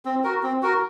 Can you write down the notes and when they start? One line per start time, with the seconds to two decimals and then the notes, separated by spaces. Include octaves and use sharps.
0.05 C4
0.24 F#4 A#4
0.43 C4
0.63 F#4 A#4